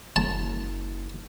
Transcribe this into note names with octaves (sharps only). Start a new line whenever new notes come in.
F#1 A5